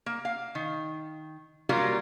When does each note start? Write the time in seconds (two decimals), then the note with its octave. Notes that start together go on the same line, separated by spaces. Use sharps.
0.06 A#3
0.25 F5
0.55 D#3
1.69 F#3 G3 A#3 F4 G4 A#4